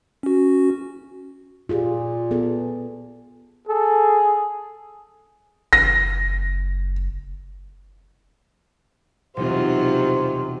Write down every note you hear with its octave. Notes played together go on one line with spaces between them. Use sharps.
C#4 F#4
A#2 F4 G4 G#4
B3 G#4 A4
G#4 A4
F#1 A#6
E1 C3 F#3 G3 D#4 F4 G4 C5